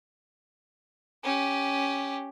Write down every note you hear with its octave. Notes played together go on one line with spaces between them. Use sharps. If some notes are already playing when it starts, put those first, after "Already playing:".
C#4 G4